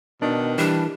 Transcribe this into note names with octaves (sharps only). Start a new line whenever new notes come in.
B2 D#3 D4
E3 G3 D4